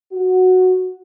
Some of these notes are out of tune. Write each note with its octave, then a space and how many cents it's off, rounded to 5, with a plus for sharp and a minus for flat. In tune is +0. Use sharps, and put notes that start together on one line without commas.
F#4 -5